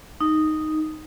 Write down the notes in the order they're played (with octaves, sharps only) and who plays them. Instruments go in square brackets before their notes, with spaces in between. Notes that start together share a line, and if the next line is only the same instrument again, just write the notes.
[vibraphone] D#4